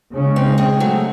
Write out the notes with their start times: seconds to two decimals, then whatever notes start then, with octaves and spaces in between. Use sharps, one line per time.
0.13 C#3 G#3 C#4
0.36 C4 D#4
0.58 G#3 C4
0.80 F#3 A3